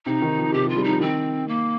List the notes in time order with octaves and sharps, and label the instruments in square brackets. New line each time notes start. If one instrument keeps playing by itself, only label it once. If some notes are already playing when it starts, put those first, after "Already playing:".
[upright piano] C3 [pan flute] D#4
[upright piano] D#3
F3
[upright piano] C3 [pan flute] G4
[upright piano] F3
[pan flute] F4
[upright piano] G3
[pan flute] D#4
[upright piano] F3
[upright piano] D#3 [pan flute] C4
[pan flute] A#3